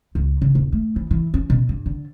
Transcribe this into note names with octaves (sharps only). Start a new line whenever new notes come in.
C#2
C#3
D#1
A3
E3
E3
C#4
B2
G2
D3